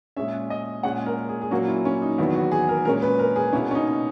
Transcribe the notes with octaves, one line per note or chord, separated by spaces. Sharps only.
A#2 G#3 C#4 E5
D#5
A#2 G#3 C#4 F#5
A#4
G#4
G#4
A#2 F#3 A#3 C#4 F#4
E4
C#4
D#4
E2 D#3 F#3 B3 E4
F#4
G#4
A#4
A#2 G#3 C#4 A#4
B4
A#4
G#4
B2 A#3 C#4 E4
C#4
D#4